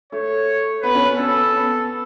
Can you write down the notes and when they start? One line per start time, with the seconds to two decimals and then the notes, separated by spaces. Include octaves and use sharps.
0.12 A3 C#5
0.83 B3 B4
0.95 C#4
1.06 B3
1.18 C#4 A4
1.54 B3